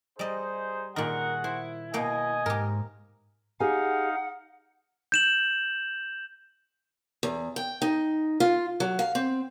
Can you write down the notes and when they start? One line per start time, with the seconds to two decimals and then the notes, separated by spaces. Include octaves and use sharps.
0.19 G3 D#4 G#4 C5 D#5
0.96 A#2 D#3 F#4 G#4 A#4 F#5
1.44 E4 C5
1.94 B2 A#3 D#5 G5 G#5
2.46 G#2 G4 A#4
3.60 D#4 G4 G#4 F5 F#5 G#5
5.12 G6 E7 F#7
7.23 E2
7.56 G5
7.82 D#4
8.40 F4
8.80 F#3
8.99 F5
9.15 C4